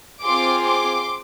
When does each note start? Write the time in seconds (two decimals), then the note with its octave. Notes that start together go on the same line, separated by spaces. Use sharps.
0.24 C4 F4 G#4 C6 D6
0.63 C6 D6